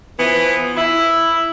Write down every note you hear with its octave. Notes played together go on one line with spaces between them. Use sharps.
E3 F3 B3
E4